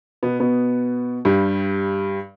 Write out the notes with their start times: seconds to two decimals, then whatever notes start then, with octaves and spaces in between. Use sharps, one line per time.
0.23 B2 B3
0.40 B2 B3
1.25 G2 G3